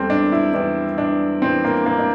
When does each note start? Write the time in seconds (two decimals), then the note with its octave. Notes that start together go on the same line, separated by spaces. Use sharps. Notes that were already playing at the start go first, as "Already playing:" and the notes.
Already playing: E2 E3 G3 C4 A4
0.10 D4
0.32 E4
0.54 E2 E3 G3 D4
0.98 D4
1.42 E2 E3 G3 C4
1.65 A#3
1.86 A#3
1.99 D4